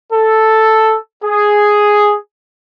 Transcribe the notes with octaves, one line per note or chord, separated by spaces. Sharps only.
A4
G#4